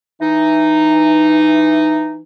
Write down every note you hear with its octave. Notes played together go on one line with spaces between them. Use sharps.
E3 D#4